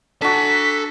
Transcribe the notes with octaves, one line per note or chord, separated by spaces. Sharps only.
D4 F#4 A4 G#5 B6